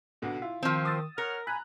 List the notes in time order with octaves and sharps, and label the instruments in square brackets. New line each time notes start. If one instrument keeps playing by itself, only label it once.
[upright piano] B1 B2 D3
E4 F4
[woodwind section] D#3 [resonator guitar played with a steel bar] F3 C4
[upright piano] D#6 E6 A6
[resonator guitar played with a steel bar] A#4 [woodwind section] C#5 F#5 F6
[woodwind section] G#5 B5 [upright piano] A#5 F#6